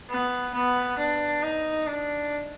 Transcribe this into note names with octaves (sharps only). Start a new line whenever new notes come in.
B3
B3
D4
D#4
D4